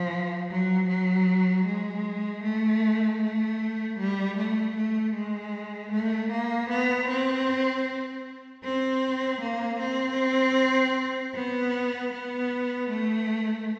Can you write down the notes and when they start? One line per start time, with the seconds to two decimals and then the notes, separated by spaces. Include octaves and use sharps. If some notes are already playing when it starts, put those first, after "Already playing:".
Already playing: F3
0.50 F#3
0.88 F#3
1.66 G#3
2.43 A3
3.22 A3
3.99 G3
4.37 A3
4.76 A3
5.15 G#3
5.92 A3
6.31 A#3
6.69 B3
7.08 C4
8.64 C4
9.41 A#3
9.80 C4
11.35 B3
12.13 B3
12.90 A3